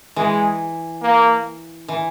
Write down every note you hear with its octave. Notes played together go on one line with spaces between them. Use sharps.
E3 G#3
A#3
E3